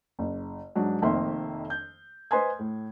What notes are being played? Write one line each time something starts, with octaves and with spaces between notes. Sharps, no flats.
F#1
G#2 F#3 D4
F1 F2 D#3 A#3 E5 C6
G6
B4 C5 D#5 G#5 C6 G#6
A2